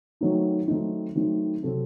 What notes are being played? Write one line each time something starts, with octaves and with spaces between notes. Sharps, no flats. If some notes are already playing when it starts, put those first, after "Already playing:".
D#3 F#3 A3 C4 D#4
D#3 F#3 A3 C4 D#4
D#3 F#3 A3 C4 D#4
C3 F#3 C4 F#4 A4